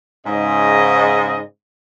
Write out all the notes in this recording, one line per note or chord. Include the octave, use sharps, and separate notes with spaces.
G#2 C#3 D#5